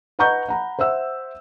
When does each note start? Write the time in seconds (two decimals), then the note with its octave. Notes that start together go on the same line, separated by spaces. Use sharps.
0.19 B4 D#5 F#5 A#5 C#6 G6
0.49 F#5 A#5 B5
0.79 C5 E5 F#5 E6